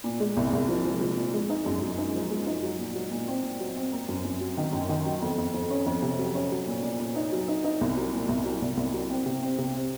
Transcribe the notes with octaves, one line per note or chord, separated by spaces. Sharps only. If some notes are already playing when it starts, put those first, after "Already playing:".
A#2
G#3
C2
C2
F3
F3
F3
A#2
G#3
D#4
F#2
F#2
D#4
F3
G#3
D#4
F#3
A#2
F#3
A#2
C4
A#2
F#3
C4
A#3
F#2
F#2
F#3
D#3
F#2
D#3
F#3
F2
F2
F2
C#4
F2
C3
F#3
C#4
F#3
A#2
A#2
A#2
D#4
F#3
D#4
D#4
C2
F#3
A#2
C2
F#3
C2
C2
F#3
C4
C3
C4
C3
C4